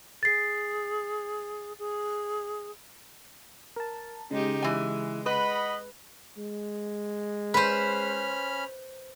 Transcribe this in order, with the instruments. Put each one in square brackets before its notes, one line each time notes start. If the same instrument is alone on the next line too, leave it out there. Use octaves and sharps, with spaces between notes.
[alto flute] G#4 [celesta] A6 C7
[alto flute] G#4
[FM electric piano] A#4 A5
[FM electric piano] C#3 [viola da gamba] G#3 D#4 G4
[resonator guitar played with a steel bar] E3 G#5 [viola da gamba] G#3
[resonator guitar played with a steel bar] B4 [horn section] D#5 F#5 B5
[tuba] G#3
[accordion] C#4 B5 F6 [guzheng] B4 C5